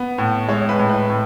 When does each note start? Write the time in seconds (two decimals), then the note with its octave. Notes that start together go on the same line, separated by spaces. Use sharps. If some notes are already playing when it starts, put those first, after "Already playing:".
Already playing: B3
0.18 A2
0.48 G#3 C#5
0.69 B4
0.79 A2
0.89 B4
1.10 A2